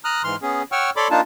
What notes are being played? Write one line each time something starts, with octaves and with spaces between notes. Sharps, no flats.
A#5 D#6 F6 F#6
G#2 E3 C6 F6
B3 C#4 G#4
C#5 F#5 G5 C#6 E6 F6
A4 C#5 D5 B5 C6 D6
A#3 D4 D#4 F4 A5